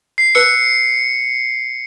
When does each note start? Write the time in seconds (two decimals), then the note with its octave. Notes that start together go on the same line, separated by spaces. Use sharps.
0.18 C7
0.35 B4 E6 C#7